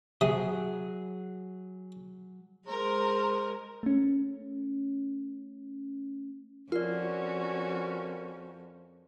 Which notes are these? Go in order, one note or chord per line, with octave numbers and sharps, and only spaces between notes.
C3 F#3 G#4 D#6
G#3 A#4 C5
A3 C#4
F2 C#4 F4 F#4 A#4 D5